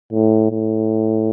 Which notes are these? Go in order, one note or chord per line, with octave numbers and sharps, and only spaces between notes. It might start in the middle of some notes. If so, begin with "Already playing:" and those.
A2
A2